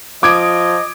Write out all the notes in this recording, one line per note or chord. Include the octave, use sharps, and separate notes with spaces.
F3 D#5 D6 D#6 G#6 D7